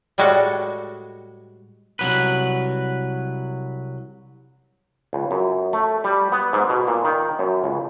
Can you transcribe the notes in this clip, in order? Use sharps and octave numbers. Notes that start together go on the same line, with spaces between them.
A2 G3 G#3 F#4 A4
C2 F#3 B4
C#2
F#2
A3
G3
B3
G#2
B2
A#2
D#3
F#2
C#2